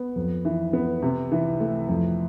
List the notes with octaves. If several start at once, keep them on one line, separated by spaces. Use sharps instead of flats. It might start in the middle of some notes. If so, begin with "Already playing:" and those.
Already playing: B3
F2
E3
B3
C3
E3
A3
F2